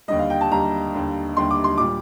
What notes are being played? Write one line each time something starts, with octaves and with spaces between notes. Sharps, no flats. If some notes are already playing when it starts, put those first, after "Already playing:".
D#2 D3 G3 D#5
F5
G5
A5
D#2 D3 G3 A#5
D#2 D3 G3
D#2 D3 G3 C6
D6
C6
A#2 G3 D6